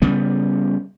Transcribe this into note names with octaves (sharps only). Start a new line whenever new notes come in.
C#3 G3 B3